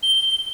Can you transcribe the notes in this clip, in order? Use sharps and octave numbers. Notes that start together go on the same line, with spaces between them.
G7